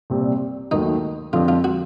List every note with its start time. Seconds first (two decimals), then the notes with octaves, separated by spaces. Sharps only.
0.10 C2 A#2 G3 C4
0.71 D#2 D#3 F#3 A3 D#4
1.33 F2 D3 F3 F4
1.48 F4
1.64 F#4